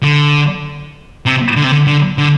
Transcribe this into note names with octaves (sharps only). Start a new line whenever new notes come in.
D3
C3
D3
C3
D3
D3
D3